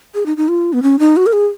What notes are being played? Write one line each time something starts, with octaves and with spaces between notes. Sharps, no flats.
G#4
D#4
D#4
F4
B3
C#4
D#4
F#4
A#4
G#4